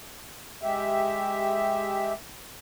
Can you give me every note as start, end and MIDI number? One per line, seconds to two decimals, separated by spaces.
0.63 2.13 56
0.63 2.13 67
0.63 2.13 76